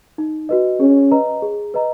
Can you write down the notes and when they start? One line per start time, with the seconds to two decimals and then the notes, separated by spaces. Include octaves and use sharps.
0.18 D#4
0.49 F#4 B4 D#5
0.80 C#4 G#4
1.12 B4 D#5 A#5
1.42 G#4
1.74 B4 D#5 A#5